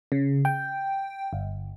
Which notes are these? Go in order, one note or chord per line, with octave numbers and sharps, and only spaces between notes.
C#3
G5
G1